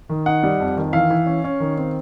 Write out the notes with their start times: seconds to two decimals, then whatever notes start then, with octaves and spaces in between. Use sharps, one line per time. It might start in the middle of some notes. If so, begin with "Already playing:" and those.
0.09 D#3
0.26 D#4 F#5
0.43 G3
0.60 F2
0.77 D#3
0.93 E3 F5
1.10 E3
1.26 C#4
1.44 C#4
1.60 D#3
1.78 C4